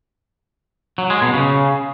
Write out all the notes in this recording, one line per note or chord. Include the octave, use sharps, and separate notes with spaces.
F#3
G#3
B2
C#3